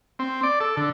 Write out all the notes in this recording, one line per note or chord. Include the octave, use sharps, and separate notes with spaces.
C4
D5
A4
D3